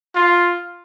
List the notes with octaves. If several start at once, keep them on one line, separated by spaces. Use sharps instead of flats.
F4